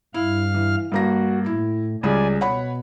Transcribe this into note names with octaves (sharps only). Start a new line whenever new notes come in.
G2 E4 F5 F6
E3
G2 A#3 F#4 A#6
A2 E4
C#2 G3 G#4 D5 G#5
B2 C#5 F#5 B5